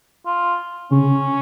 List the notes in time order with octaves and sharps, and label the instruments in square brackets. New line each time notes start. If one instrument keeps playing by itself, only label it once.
[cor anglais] F4
[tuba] C#3 [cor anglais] C#4